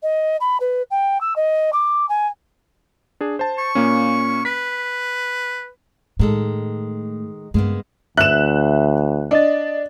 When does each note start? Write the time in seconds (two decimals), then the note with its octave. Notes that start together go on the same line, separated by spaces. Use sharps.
0.03 D#5
0.40 B5
0.60 B4
0.90 G5
1.21 E6
1.36 D#5
1.73 D6
2.09 G#5
3.21 D4 G#4
3.39 C5 A5
3.58 C#6
3.75 A#2 A#3 C#4
4.45 B4 B6
6.19 A2 D#3 G#3 A4
7.54 G2 C#3 G#3 A#3 B3
8.17 D2 E5 F#6 E7
9.31 D4 D5 D#5 A6